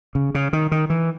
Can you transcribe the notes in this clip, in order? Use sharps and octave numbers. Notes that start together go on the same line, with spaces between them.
C#3
C#3
D#3
D#3
E3